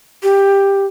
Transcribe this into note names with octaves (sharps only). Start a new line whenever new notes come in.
G4